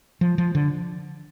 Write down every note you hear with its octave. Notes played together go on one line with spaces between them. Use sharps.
F3
F3
D3